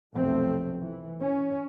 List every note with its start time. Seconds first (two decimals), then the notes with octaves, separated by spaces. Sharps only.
0.16 F1 B1 F2 A3 C4
0.81 E3
1.21 C#4